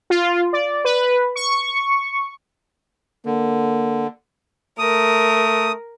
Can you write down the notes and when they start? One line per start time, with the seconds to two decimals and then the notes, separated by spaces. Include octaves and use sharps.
0.10 F4
0.53 D5
0.85 B4
1.36 C#6
3.26 D3 A#3
4.79 A3 A#4 D#6